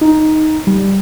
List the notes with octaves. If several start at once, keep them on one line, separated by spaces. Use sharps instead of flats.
D#4
G3